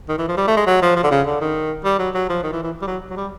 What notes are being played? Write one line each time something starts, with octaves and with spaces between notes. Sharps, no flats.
D#3
E3
F3
G3
A3
G#3
F#3
F3
F3
D3
C#3
D3
D#3
G3
F#3
F#3
F3
D#3
E3
E3
G3
F#3
F#3
G3